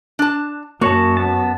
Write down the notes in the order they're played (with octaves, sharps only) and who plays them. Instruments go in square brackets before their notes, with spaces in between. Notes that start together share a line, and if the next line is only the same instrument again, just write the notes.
[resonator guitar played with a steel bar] D4 A5
[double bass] F#2 [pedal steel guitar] A#3 C#5 A5 [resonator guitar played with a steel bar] F#4
[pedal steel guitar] B3 A5